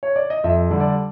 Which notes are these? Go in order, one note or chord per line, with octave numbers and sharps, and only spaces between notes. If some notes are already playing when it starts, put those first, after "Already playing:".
C#5
D5
D#5
F2 E5
D3 G3
D5